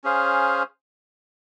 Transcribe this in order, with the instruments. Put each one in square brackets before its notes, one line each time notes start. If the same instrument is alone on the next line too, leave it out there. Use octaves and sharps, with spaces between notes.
[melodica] C#4 G#4 C5 F5